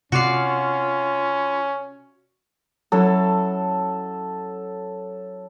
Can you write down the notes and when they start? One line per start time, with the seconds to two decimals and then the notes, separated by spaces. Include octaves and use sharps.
0.12 C3 C#4 F4 F#4 D5 F5
2.92 F#3 C#4 E4 A4